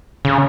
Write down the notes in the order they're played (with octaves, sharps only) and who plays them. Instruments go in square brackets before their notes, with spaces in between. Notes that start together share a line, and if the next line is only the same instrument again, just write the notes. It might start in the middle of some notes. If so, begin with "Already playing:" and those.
[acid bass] C#3